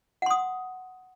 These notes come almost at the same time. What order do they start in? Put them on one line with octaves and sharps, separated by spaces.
F#5 C6 D#6